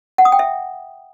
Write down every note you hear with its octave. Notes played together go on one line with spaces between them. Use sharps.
F#5
D#6
G5
E5